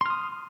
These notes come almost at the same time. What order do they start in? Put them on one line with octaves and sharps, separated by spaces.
C6 F6 D#6